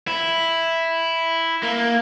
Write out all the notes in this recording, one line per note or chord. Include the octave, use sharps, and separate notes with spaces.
E4
A#3